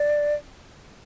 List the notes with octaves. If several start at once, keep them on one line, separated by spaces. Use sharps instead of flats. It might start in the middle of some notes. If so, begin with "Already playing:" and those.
Already playing: D5